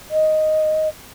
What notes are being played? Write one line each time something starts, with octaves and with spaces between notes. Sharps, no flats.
D#5